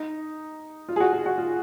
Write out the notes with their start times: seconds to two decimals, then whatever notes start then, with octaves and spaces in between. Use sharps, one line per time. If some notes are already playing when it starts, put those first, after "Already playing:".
Already playing: D#4
0.89 F4
0.96 G#4
1.00 F#4
1.13 G#4
1.26 F#4
1.38 F4